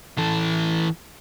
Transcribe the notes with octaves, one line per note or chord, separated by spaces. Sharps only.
E3 A4